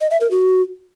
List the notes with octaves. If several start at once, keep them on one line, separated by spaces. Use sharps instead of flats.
D#5
E5
A#4
F#4